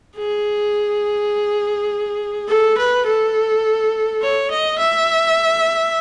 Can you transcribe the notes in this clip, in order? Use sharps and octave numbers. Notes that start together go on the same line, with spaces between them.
G#4
A4
B4
A4
C#5
D#5
E5